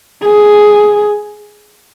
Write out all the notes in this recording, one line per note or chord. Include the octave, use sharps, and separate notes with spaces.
G#4